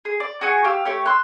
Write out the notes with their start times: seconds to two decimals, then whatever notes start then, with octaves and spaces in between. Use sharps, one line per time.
0.05 G#4
0.20 D5
0.41 F#4 G#4 G#5 C#6
0.64 G4 F5 E6
0.85 A3 G4 C#5
1.06 C6 E6 F#6